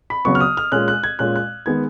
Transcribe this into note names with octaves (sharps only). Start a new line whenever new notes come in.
B5
C#3 F#3 B3 C#6
F6
D#6
F6
A#2 G#3 C#4 F#6
F#6
G#6
A#2 G#3 C#4 F#6
F#6
D#3 G#3 B3 G#6